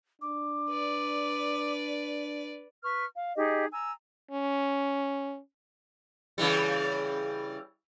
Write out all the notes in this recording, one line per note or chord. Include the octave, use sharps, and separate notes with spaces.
D4 D6
B4 D5
B4 C#6 F6
F5
D#4 G4 G#4 D#5
G#5 A#5 E6
C#4
C#3 E3 G3